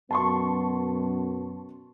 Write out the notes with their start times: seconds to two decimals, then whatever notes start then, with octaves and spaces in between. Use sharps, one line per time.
0.11 F#2 B2 B3 A5 C6 C#6